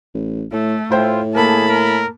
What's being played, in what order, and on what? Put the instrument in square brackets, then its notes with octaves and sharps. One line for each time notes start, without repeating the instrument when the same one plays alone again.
[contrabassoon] A1
[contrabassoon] A2 [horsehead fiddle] A3
[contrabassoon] A2 [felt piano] E4 C5 G5 [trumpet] F4
[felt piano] A#3 A4 [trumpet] G#4 [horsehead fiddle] A5 B5
[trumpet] A#4